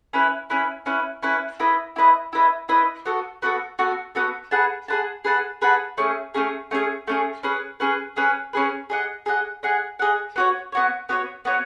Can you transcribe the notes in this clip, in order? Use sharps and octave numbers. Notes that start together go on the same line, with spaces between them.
C#4 E4 B4
C#4 E4 B4
C#4 E4 B4
C#4 E4 B4
E4 B4 D#5
E4 B4 D#5
E4 B4 D#5
E4 B4 D#5
B3 F#4 A4
B3 F#4 A4
B3 F#4 A4
B3 F#4 A4
G#4 B4 F#5 A5
G#4 B4 F#5 A5
G#4 B4 F#5 A5
G#4 B4 F#5 A5
A3 C#4 G#4
A3 C#4 G#4
A3 C#4 G#4
A3 C#4 G#4
C#4 G#4 B4
C#4 G#4 B4
C#4 G#4 B4
C#4 G#4 B4
G#4 D#5 F#5
G#4 D#5 F#5
G#4 D#5 F#5
G#4 D#5 F#5
B3 F#4 C#5
B3 F#4 C#5
B3 F#4 C#5
B3 F#4 C#5